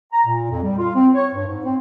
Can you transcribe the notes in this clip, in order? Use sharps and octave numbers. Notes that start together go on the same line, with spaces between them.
A#5
A#2
F2
G3
F4
C4
C#5
G2
G#2
C4